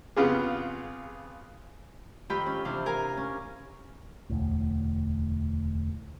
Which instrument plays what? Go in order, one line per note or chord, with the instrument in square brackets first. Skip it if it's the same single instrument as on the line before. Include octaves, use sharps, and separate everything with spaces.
[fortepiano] F2 C#3 B3 F4 G4 G#4
[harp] F2 D#3 F4 G4 G5 B5
C#4
C3 E3 D4 C5 F5
A#4 F5 G#5
C#4
[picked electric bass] E1 D2 A2